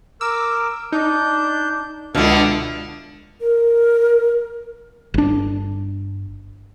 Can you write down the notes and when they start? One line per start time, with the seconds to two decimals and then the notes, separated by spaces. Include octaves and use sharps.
0.21 A#4 D6 E6
0.92 D4 D#4 G6
2.15 C#2 B2 D3 B3 E4 A4 F5
3.41 A#4
5.14 G1 D4